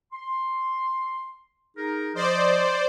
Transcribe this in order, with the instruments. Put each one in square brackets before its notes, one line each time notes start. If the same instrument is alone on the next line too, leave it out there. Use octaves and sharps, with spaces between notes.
[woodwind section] C6
D#4 G#4 A#4
[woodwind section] F3 D#5 [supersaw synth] C5 D5